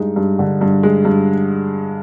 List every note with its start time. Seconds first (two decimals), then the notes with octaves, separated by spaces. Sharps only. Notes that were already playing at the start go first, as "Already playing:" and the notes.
Already playing: G2 G#3 D#4
0.16 G2
0.39 D3
0.61 G2
0.83 G#3
1.05 G2